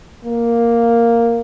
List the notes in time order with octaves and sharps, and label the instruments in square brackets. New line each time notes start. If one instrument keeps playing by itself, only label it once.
[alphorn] A#3